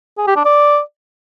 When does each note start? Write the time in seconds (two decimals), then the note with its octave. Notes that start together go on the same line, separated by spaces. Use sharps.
0.18 G#4
0.27 G4
0.36 D4
0.45 D5